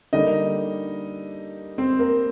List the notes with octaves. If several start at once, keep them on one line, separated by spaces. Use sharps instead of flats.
D3 G3 A#3 D#4 D#5
C4 C5
A#3 A#4